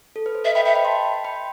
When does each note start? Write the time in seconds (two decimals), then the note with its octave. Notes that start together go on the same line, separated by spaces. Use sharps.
0.16 A4
0.26 B4
0.35 C5
0.45 B4 D#5 E5
0.55 E5 G5 B5
0.65 E5 G5 B5
0.75 G5 B5
0.85 A5 C6
1.24 G5 B5